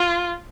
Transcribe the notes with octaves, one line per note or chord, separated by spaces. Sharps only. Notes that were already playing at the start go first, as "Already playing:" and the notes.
Already playing: F4